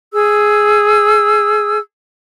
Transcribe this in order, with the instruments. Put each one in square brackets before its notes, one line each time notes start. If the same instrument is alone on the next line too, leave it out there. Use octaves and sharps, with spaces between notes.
[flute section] G#4 E6